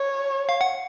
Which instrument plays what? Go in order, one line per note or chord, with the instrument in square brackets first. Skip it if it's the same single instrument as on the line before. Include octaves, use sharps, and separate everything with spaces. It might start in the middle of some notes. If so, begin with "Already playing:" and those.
Already playing: [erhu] C#5
[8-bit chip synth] F5
F#5